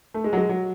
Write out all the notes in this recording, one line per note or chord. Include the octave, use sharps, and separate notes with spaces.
A3
G#3
F#3
G#3
F#3